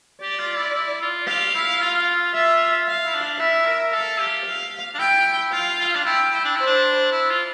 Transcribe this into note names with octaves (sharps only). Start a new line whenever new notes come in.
G4 D5
F4
E4
E4
F4
G4 F5
E4
F4
F4 E5
F5
E4
D4
E4 E5
A#4
A4 F5
G4
F5
D4
E4 G5
F4 F5
F4
D4
E4 G5
E4
D4
E4 C5
D4
E4
F4